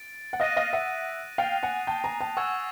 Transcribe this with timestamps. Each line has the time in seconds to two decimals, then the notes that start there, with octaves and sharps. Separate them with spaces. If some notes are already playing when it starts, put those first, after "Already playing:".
Already playing: A6 D7
0.33 F#5
0.40 D#5 F5 D#6 F#6 A#6 D#7
0.56 D#5 F5
0.73 E5 F#5
1.38 F5 G5 A6 C7 F7
1.63 F#5 G#5
1.87 G5 A5
2.04 G#5 A#5
2.21 G5 A5
2.37 F#5 G#5 C#6 E6 G#6